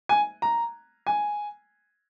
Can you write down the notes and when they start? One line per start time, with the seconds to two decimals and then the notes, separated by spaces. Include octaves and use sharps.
0.09 G#5
0.42 A#5
1.07 G#5